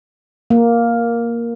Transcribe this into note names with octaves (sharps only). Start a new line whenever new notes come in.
A#3